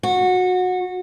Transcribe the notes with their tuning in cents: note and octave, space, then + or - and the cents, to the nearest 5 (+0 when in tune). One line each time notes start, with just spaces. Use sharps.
F#4 -20